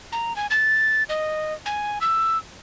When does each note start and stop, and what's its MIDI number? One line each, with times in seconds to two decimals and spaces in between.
0.12 0.36 82
0.36 0.47 80
0.51 1.03 93
1.09 1.54 75
1.66 1.99 80
2.01 2.38 88